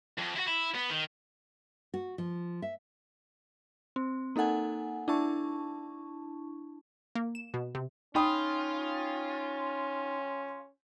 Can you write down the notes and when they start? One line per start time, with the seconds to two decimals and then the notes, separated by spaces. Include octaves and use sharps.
0.18 F2 F3
0.35 E4 F#4
0.47 E4
0.75 B3
0.90 D#3
1.94 F#4
2.18 F3
2.62 E5
3.96 C4
4.36 A#3 D#4 A4 F#5 G#5
5.08 D4 E4 A5 C#6
7.15 A#3
7.35 E7
7.54 B2
7.75 C3
8.15 C#4 D#4 F4 G5 B5 D#6